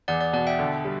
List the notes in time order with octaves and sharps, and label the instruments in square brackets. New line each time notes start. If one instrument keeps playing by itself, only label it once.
[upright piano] E2 [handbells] D5 F#5
[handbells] D5 F#5
[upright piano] B2 [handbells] D5 F#5
[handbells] E5 G5
[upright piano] D3
G3